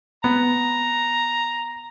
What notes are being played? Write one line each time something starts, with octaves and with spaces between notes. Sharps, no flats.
B3 A#5